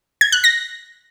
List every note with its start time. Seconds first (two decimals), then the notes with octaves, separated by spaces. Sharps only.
0.21 G#6
0.32 F#6
0.44 A#6